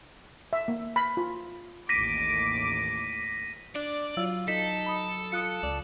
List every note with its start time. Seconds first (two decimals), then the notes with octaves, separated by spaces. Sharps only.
0.53 E5
0.68 A#3
0.96 B5
1.17 F4
1.89 A1 D#2 D6 A#6 B6 D#7
3.75 D4 D5
4.17 F#3 F4 E6
4.48 D#4 A4 B6
4.86 B5 D#6
5.32 F4 D#6 F#6 C#7
5.63 C#2 D5